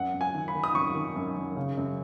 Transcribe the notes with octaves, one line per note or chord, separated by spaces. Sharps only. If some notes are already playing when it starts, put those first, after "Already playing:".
Already playing: F#2 F#5
F#2
G#5
D#3
B5
D#3
D#6
F#2 C#6
D#3
F#2
F#2
C#3
F#2